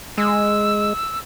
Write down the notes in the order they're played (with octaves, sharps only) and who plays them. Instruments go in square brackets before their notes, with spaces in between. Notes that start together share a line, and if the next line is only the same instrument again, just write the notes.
[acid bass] G#3 [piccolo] E6